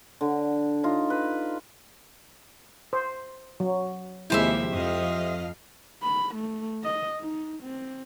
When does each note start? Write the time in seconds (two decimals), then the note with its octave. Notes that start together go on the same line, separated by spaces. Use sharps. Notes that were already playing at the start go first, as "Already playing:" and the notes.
0.21 D3
0.83 D#4 F4
1.10 B4
2.93 C5
3.60 F#3
4.30 D#2 C3 F3 G#3 E4 G4 C5 E5
4.73 F2 D#5 F5
6.02 B5
6.35 A3
6.83 D#5
7.20 D#4
7.63 C4